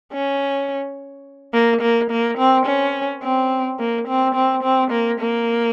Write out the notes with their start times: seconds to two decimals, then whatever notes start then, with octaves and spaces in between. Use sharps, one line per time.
0.13 C#4
1.54 A#3
1.82 A#3
2.11 A#3
2.38 C4
2.66 C#4
3.23 C4
3.79 A#3
4.08 C4
4.35 C4
4.64 C4
4.91 A#3
5.20 A#3